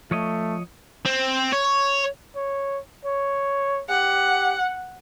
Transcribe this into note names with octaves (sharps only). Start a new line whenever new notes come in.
F3 A3 C#5 D#5
C4
C#5
C#5
C#5
G4 F#5